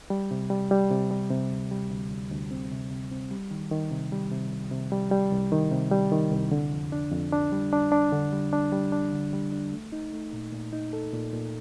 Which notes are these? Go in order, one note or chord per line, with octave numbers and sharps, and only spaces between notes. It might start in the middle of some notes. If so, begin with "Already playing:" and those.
G3
C3
G3
G3
C3
G3
C3
D2
G3
D2
D2
D2
C4
C3
C3
C4
G3
D#3
D#3
C3
G3
C3
C2
C3
G3
G3
C2
D#3
C3
G3
D#3
C2
D3
F2
D4
F2
D4
G3
D4
D4
D3
G3
D4
G3
D4
D3
G3
D4
A3
D#4
A3
A#2
A#2
D#4
A4
A#2
A#2